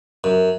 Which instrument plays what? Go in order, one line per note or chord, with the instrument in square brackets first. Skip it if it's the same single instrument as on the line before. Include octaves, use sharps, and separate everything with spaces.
[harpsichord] F#2